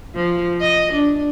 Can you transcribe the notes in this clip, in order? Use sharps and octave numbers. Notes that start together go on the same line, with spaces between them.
F3
D#5
D4